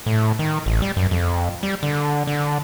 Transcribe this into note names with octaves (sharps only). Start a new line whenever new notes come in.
A2
D#3
A1
G3
F#2
F2
G3
D3
D3